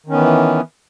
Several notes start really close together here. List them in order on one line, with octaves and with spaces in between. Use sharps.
D#3 C#4 B3 E3